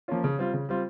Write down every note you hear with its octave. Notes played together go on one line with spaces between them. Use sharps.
F3 A#3 C#4 F4
C#3
G3 C4 F4
C#3
G3 C4 F4